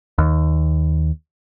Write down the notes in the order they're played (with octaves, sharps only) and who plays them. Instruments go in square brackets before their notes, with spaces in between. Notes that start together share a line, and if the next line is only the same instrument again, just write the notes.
[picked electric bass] D#2